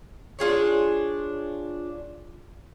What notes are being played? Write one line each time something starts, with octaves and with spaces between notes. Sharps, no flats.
D4 F4 G#4 C#5